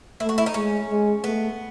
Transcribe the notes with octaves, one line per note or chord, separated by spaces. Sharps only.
A3 E4
F#4
E4
D#4
G#3 C#4
G#3
A3 B3